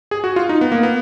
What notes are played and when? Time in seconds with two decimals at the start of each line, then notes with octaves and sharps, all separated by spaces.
0.11 G#4
0.24 F#4
0.36 F4
0.49 D#4
0.61 B3
0.72 A#3
0.83 B3